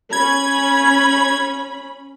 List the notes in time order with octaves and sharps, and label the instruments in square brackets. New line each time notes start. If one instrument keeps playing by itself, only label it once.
[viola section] C#4 B5 [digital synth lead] G#6